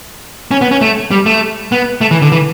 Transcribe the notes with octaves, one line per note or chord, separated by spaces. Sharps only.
C#4
B3
C#4
A3
G3
A3
B3
A3
E3
D3
E3